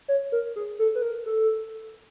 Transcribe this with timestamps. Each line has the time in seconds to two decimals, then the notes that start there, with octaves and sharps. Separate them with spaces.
0.08 C#5
0.32 A#4
0.56 G#4
0.79 A4
0.95 B4
1.02 A#4
1.26 A4